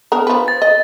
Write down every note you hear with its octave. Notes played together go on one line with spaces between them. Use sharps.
B3 D4 A#4
F3 B4
A6
D#5